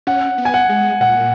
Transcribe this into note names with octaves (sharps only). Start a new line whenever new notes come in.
C#4 F#5
B3
G#5
F#5
G#3
A#2 F#5